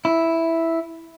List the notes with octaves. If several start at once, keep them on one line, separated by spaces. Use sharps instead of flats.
E4